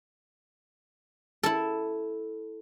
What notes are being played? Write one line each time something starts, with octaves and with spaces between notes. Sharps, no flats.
E4 A4